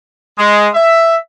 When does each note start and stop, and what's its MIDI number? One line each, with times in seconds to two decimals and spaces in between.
0.38 0.68 56
0.74 1.16 76